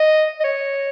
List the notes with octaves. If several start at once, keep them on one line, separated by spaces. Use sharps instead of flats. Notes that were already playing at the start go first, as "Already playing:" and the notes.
Already playing: D#5
D#5
C#5